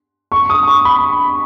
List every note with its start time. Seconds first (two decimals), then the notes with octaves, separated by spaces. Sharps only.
0.32 C#6
0.50 D#6
0.67 C#6
0.85 B5